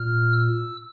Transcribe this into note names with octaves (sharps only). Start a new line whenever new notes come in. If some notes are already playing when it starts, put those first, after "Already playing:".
Already playing: A#2 F6
E6